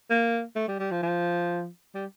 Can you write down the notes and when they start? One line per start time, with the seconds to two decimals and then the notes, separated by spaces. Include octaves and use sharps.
0.10 A#3
0.56 A3
0.68 G3
0.80 G3
0.91 F3
1.03 F3
1.95 G3